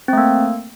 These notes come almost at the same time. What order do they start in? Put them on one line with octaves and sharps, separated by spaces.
C4 A3 A#3